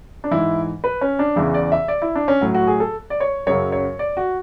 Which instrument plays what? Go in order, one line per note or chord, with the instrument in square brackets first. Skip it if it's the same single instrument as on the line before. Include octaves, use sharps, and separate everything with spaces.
[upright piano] D4
G#2 E3 E4
B4
C#4
D4
E2 C#3 E3 E4
D5
E5
D5
E4
D4
C#4
A2 F#3
F#4
G#4
A4
D5
C#5
F#2 C#3 F#3 C#5
C#5
D5
F#4